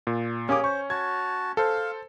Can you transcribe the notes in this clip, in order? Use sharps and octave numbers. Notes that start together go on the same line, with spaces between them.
A#2
A#3 C#4 G4 G#4 D6
C5 C#6
F#4 A5 G#6
A4 C5 F5